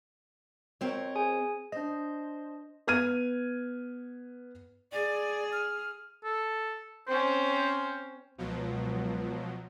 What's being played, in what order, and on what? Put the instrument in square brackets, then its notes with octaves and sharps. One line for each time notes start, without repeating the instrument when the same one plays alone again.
[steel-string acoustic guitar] F2 C4 A#4 [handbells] F#4 C5 C#5
[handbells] G#4 G#5
[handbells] D4 D#5 [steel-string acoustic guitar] C5
[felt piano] B3 F6 G#6 D#7
[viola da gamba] G#4 [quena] D5
[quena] F6
[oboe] A4
[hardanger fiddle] C4 C#4 [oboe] C5
[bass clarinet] C#2 [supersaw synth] B2 F3 F#3